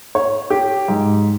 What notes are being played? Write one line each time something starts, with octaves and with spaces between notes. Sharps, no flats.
C#5
G4
G#2